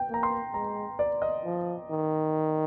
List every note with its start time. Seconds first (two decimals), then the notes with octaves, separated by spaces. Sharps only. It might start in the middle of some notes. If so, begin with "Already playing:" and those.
Already playing: G5
0.09 A#3
0.14 A#5
0.23 C6
0.54 G#3 A#5
0.99 D5
1.22 D#5
1.45 F3
1.90 D#3